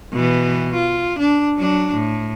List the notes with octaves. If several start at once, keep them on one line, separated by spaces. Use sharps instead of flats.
B2 E3
F4
D4
F#3 D4
A2